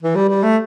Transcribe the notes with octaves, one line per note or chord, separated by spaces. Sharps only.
E3
G3
G3
A3